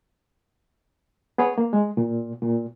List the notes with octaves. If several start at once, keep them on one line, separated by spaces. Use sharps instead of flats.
B3 G#4 B4 C#5
A#3
G#3
A#2
A#2